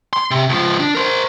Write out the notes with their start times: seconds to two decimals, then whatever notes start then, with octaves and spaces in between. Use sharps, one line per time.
0.13 C6
0.31 C3
0.49 C#2 F3
0.80 D4
0.95 A#4 C5